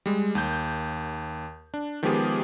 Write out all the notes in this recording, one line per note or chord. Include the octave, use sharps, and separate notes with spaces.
G3 G#3
D#2 G6
D4
D#3 F3 G#3 B3 G4 G#4